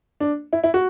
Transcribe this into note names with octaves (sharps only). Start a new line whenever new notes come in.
D4
E4
E4
F#4